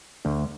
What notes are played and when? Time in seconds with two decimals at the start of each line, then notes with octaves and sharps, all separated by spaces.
0.25 D2